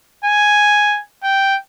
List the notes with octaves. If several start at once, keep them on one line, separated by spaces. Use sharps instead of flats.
G#5
G5